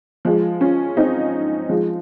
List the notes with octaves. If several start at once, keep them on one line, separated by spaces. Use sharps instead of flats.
F3 G#3
C#4 F4
C4 D#4
F3 G#3